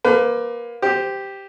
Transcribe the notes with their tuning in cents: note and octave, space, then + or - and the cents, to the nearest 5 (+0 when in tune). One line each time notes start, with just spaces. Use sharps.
A#3 +20 B4 +35
G4 +0 C5 -20